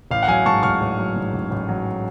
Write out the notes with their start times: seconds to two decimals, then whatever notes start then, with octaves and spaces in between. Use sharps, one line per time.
0.11 A1 F5
0.23 F#5
0.28 F#3 F5 G#5
0.46 G#2 A5 C#6
0.63 A1 C#6 F6
0.81 A1
0.99 F#3
1.16 G#2
1.33 A1
1.51 A1
1.69 F#3